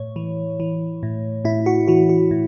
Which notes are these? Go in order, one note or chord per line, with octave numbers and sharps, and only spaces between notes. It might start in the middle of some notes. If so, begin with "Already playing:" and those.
Already playing: A2 C#5
E3
E3
A2
A2 E4
F#4
E3 F#4
F#4
A2